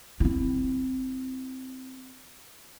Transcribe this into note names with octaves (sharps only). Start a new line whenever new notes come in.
C4 E4